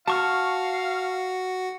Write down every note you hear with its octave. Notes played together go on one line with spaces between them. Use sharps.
F#4 F5 A5 C#6 F6